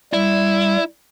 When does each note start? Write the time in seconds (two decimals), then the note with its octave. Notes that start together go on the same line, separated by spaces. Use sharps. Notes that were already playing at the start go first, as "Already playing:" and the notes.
0.13 G3 E4